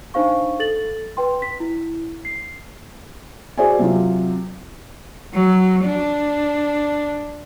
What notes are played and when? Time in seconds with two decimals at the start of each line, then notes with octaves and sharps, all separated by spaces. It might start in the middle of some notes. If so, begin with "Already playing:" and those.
0.14 D4 D#4 C5 F5 C#6
0.59 A4 A6 F#7
1.17 B4 G5 C6
1.42 B6
1.60 E4
2.25 C7
3.58 F#4 G#4 C5 D5 E5 G#5
3.79 C3 F#3 F4
5.33 F#3
5.84 D4